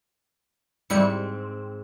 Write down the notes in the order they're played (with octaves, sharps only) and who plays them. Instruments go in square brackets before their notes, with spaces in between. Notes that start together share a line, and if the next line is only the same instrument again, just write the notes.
[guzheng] G#2 C4 [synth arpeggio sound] G3 E4 C#7